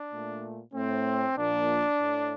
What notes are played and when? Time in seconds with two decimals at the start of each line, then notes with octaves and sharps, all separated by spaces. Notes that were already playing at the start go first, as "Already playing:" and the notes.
Already playing: D4
0.11 A#2 A3
0.73 A2 A3 C4
1.36 A#2 F3 A#3 D4
1.99 A2 A3